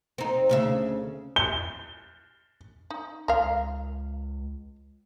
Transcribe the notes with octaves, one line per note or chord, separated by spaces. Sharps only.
C4 D#4
D2 C#3 E5
G7
D#4
C#2 A#4 F5